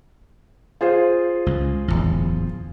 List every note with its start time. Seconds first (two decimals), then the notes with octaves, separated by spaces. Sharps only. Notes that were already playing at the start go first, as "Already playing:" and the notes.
0.81 F4 G#4 C5
1.46 C#2
1.88 D1 G1 E2